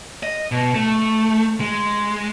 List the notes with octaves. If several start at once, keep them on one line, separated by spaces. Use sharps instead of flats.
D#5
B2
A3
G#3